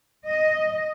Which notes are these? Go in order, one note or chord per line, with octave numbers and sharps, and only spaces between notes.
D#5